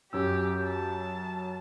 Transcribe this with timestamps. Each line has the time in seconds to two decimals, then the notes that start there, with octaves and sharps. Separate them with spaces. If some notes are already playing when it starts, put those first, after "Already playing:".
0.13 F#2 C#4 G4 E6
0.64 A5